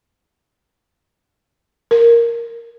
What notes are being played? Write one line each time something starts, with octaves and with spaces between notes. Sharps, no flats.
A#4